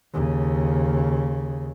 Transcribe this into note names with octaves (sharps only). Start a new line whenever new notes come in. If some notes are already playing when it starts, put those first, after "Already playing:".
D#2 C#3